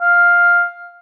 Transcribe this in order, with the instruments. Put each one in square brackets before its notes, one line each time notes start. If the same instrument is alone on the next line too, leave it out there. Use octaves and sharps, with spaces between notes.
[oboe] F5